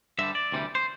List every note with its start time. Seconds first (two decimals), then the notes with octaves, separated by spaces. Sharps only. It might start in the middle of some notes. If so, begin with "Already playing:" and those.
0.19 G2 D3 G3 E5
0.35 D5
0.52 D2 C3 E3 G3
0.75 C5